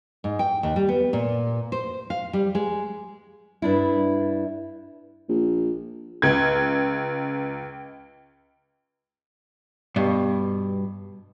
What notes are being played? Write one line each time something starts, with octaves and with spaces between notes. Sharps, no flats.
G#2
G5
D#2
G3
B3
A#2
C5
F5
G3
G#3
G2 D4 E4
A#1
C#2 G#6
G2 B2